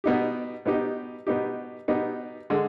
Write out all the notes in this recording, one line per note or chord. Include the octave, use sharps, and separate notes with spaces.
B2 B3 D#4 G4
B2 B3 D#4 G4
B2 B3 D#4 G4
B2 B3 D#4 G4
D3 G#3